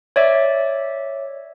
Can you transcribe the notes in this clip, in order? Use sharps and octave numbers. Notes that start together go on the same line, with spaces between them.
C#5 D5 E5